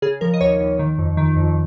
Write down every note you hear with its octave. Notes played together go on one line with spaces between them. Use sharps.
C#3 G#4
F3 A#4
D#5
D#2 C#5
D#2
D#3
F2
D#3
F2